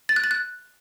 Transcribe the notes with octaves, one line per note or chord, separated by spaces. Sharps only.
A6
F#6
A6
F#6